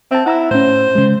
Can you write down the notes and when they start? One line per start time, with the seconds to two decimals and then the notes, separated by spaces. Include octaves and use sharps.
0.11 C4 E5 A5
0.26 E4 F#5 A#5 E6
0.51 A2 C#4 C5
0.95 C#3 G#3